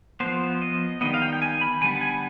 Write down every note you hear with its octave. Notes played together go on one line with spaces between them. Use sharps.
F3 B3 C5
D#5
D#3 G3 B3 D#5
F5
G5
G5
G#5
B5
D3 G3 B3 G#5
G#5